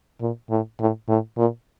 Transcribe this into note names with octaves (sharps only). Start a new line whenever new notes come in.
A#2
A2
A2
A2
A#2